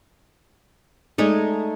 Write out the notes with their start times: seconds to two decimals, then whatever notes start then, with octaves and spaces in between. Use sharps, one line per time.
1.18 G#3 A3 D#4 D5 G#5